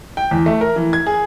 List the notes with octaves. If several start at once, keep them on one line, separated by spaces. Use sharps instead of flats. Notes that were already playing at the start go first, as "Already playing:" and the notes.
G5
E2
A3
A#4
E3
G#6
G#4